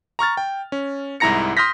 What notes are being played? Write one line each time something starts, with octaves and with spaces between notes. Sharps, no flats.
A#5 C#6 F6 A6
G5
C#4
C2 G#2 E4 A#5 A#6 C#7
C6 D#6 F6 G6 A#6 B6